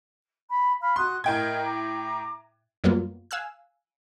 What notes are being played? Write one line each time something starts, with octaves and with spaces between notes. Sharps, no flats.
B5
F5 B5 F6
F#4 C6 D#6 F#6
A2 A#4 D#5 G5 G#6
A#5 D6
F#2 F#3 G3 A#3 B3 F4
F5 G#5 E6 F#6